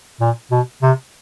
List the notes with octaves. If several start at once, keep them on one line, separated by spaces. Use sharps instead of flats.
A#2
B2
C3